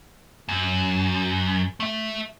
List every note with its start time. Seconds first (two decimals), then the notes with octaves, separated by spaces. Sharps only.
0.49 F#2
1.80 A3 E5